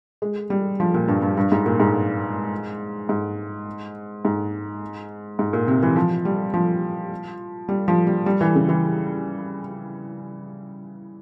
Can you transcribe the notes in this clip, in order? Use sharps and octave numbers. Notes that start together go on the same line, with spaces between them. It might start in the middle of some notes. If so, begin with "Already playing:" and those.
G#3
G3
F3
A#2
G2
G2
G2
G#2
A#2
G#2
G#2
G#2
G#2
A#2
C3
E3
F3
G3
F3
G3
F3
G3
G3
E3
C#3
E3